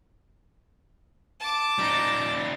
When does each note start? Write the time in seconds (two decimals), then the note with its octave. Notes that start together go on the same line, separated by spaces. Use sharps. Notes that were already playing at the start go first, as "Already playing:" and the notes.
1.40 A5 D6
1.79 G3 D#4